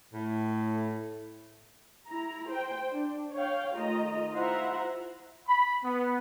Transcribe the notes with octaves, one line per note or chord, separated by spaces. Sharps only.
A2
E4 A#5
C5 G5
D4
C#5 F5 G5
D#3 A3 F4 D#5 A#5
E4 F4 C5 E5 F#5 A#5
B5
B3